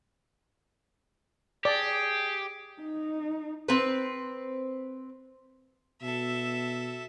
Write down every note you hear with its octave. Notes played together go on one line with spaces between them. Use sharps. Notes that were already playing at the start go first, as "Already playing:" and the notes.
G4 G#4 D5
D#4
C4 B4
B2 A4 E5